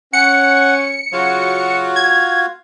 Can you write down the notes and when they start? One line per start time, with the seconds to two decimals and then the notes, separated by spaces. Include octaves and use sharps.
0.13 C#4 F#5 C#7
1.13 C#3 F#3 F4 F#4 F5
1.96 G#6